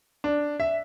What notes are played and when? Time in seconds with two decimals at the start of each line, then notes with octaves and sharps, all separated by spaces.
0.24 D4
0.60 E5